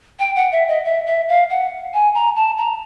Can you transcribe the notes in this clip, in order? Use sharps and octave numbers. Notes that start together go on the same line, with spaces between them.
G5
F#5
E5
D#5
E5
E5
F5
F#5
G#5
A#5
A5
A#5